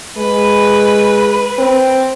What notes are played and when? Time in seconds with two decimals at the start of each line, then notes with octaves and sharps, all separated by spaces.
0.17 G#3 B4
1.58 C4